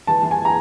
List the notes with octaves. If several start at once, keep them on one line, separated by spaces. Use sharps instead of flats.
E3 A5
E3
G#5
A#5